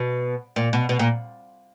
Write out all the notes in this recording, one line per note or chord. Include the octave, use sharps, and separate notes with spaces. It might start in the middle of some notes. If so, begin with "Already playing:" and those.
Already playing: B2
A#2
B2
B2
A#2